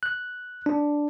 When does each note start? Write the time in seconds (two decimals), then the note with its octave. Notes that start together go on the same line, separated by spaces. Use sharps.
0.03 F#6
0.66 D4